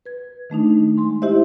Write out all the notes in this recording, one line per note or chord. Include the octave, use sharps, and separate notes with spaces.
B4 G#6
D#3 A3 D4 D#4
G#3 C6
E4 G4 C5 D#5 E5